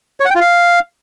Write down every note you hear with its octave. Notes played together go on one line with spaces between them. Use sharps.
C#5
F#5
G5
F4
F5